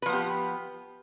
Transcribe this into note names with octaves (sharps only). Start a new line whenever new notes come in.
F3 B3 G4 B4